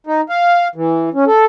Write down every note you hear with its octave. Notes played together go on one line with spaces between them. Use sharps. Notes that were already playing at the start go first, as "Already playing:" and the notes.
D#4
F5
E3
C#4
A4